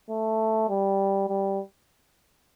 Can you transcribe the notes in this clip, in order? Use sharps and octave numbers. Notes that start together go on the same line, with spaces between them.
A3
G3
G3